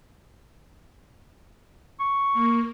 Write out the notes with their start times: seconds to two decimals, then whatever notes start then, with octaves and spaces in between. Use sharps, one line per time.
2.00 C#6
2.33 A#3